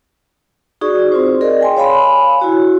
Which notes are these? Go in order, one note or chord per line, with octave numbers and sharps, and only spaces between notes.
D#4 F#4 G#4 D5 C#6
C4 F4 C5
G#4 A#4 D5 D#5
G5 G#5 C6
C#5 F5 G#5 B5
E4 F#4 C#5